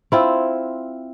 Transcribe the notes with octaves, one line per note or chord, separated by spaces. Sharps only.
C4 E4 F4